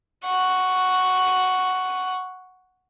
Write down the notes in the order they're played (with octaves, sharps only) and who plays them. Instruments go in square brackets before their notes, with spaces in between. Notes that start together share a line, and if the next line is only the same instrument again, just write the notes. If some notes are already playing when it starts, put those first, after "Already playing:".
[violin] F#5 C#6